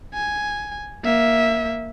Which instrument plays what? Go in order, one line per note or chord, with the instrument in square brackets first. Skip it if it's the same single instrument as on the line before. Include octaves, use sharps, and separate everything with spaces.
[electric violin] G#5
A#3 E5